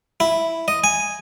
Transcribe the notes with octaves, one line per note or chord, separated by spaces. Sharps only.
E4
D#5
G#5